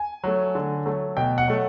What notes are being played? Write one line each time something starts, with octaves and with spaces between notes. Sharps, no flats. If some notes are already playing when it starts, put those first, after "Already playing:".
Already playing: G#5
F#3 A3
D3
F#3 A3
B2 G5
F#5
F#3 A3